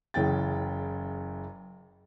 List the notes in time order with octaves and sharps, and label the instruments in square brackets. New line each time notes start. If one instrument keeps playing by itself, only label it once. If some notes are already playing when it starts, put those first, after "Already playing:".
[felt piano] F#1 C#3 E3 G5 A6